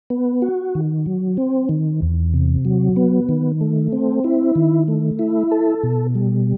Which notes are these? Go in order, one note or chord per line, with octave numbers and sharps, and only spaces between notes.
B3
F#4
D#3
F#3
C4
D#3
E2
C3
F#3
B3
D#3
A3
C4
E4
D#3
A3
E4
A4
B2
G3